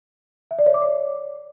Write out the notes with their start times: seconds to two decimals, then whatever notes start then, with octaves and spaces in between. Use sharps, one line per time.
0.51 E5
0.59 D5
0.66 C#5
0.74 D6
0.82 D5